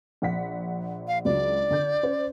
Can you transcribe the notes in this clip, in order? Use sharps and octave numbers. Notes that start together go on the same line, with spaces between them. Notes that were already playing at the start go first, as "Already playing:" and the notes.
A#1 F#5 B6
F5
C#2 F#3 D4 D5
D3 G6
C#4 C5